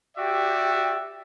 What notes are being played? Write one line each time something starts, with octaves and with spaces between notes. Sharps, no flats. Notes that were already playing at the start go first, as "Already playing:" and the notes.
F#4 G4 D5 E5 G5